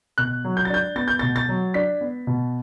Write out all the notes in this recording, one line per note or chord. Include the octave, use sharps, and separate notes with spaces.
B2 F#6
F#3
G6
A6
D4 G6
B3 A6
G6
B2 A6
A6
F#3
D4 B6
B3
B2